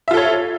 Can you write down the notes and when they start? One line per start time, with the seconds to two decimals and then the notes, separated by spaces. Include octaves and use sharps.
0.08 E5
0.11 F4
0.14 A4
0.17 C#5